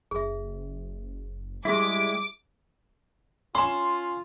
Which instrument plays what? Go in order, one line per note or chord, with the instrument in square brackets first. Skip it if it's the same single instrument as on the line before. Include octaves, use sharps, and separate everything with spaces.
[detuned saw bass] F#1 [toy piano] G#4 E5
[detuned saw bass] G3 [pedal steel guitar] G#3 E4 [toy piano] G4 G#4 E5 [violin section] D6
[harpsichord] C#4 [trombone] F4 [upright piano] C6 E7